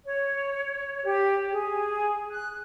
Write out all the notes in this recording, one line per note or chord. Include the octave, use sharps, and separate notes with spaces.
C#5
G4
G#4
F#6